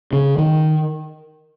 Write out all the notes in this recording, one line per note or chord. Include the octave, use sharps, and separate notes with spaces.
C#3
D#3